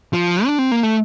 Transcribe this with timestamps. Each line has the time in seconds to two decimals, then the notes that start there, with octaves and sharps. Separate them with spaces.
0.13 F3
0.46 D4
0.59 C4
0.72 A#3
0.83 A3